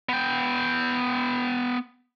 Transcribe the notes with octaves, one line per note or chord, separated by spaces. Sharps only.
B3 G5